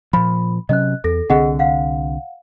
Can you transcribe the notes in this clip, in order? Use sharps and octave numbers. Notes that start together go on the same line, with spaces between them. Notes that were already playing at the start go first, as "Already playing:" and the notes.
A#2 F3 B5
C3 F#3 C#4 D#5 F#6
E2 A4 A#6
C2 D3 C4 G#4 D#5 F#5
F5 F#5